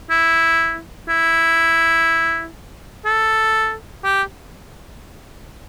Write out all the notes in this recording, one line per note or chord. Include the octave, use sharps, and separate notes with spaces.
E4
E4
A4
G4